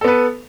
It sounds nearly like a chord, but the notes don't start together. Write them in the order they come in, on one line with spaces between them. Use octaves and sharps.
A4 B3 B4